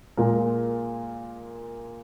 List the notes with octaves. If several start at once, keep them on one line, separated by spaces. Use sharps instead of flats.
A#2 G#3 F4 A#4